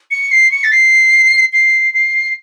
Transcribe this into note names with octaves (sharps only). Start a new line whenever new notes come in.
C#7
C7
C#7
A6
C7
C7
C7